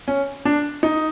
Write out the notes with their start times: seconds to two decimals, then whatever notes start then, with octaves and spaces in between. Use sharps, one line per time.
0.08 C#4
0.45 D4
0.83 D#4